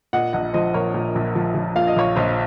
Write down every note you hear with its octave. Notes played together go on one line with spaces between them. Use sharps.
A#2 D#5 F#5
A#1 D#5 F#5
F3 C5 D#5
A#1 A#4 C#5
A#2
A#1
F3
F3
A#2 F5
D#5
A#1 C#5 F5
A#1 C5 D#5